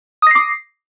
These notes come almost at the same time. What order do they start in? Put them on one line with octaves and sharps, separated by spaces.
D#6 A#6 C7 D6